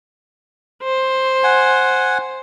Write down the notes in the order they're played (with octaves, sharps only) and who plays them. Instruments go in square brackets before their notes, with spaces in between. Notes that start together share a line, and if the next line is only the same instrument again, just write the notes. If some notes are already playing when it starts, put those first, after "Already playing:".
[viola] C5
[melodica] F#5 G#5